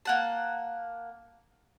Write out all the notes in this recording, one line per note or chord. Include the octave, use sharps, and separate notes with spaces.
A#3 F#5 A5